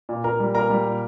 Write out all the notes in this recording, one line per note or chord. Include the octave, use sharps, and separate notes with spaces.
A#2
A#2 A#4 A#5
G3
A#2 A#4 A#5
G3
A#2